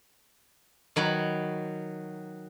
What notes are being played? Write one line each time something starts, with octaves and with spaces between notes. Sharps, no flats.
D#3 F#3 B5